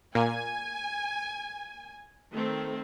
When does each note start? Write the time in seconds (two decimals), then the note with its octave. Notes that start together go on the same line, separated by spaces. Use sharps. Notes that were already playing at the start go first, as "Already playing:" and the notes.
0.15 A#2 G#5
2.32 D#3 A3 C4